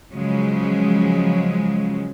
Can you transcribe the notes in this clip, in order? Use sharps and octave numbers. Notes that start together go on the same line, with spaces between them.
C#3 F3 F#3 G#3